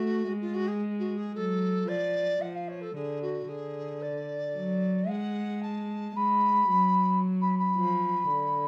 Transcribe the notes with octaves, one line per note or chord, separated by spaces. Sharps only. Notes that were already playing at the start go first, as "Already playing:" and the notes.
Already playing: A3 F#4
G#3
F4
F#4
G#4
F#4
G#4
F#3 A4
F3 D5
F3 F#5
F5
C#5
A4
D3 G#4
F#4
D3 G#4
D5
F#3
G#3 F#5
A5
G#3 B5
F#3
B5
B5
F3
D3